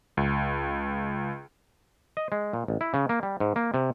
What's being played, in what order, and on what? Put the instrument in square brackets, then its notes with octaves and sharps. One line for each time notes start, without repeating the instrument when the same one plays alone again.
[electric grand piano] C#2
[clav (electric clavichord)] D#5
G#3
A#2
A1
E4
C#3
A#3
G3
G#2
A#3
C3